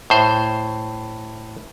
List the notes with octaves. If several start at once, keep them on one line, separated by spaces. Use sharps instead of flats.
A2 C5